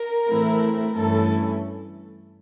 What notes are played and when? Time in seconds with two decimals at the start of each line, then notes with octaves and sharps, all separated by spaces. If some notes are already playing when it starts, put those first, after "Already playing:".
Already playing: A#4
0.28 A2 E3 A3 C4 E4
0.95 G2 E3 A3 C#4 E4 A4